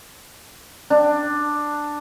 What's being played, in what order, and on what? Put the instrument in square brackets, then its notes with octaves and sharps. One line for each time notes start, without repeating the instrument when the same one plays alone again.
[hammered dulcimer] D4